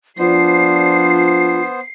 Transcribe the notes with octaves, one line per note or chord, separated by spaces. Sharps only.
F3 B3 D4 F4 C5 C7